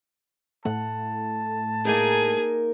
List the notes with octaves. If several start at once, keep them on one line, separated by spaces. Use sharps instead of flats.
A2 A3 F#5 A5
A#3 D#4 G#4 A#4 G#5